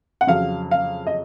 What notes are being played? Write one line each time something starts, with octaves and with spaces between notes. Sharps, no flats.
F#5
F2 C#3 F#3 F5
F5
D#5